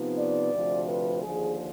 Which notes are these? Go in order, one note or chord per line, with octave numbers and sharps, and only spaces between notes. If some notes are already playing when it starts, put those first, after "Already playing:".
Already playing: C3 F3 B3 D#4
D5
D2 C3 F3
B4
D#2 D3 F3 G#4